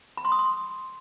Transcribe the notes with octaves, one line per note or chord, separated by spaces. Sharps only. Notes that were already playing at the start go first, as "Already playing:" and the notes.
B5
C6
D#6
C6